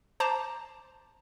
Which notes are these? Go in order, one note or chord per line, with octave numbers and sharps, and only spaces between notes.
C5 A5 A#5 D6